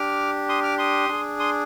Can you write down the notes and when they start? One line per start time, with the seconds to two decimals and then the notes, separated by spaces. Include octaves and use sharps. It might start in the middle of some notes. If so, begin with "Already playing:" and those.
Already playing: D4 G4 D6 F6
0.49 C6 D#6
0.63 D6 F6
0.78 C6 D#6
1.09 D4 G#4
1.39 C6 D#6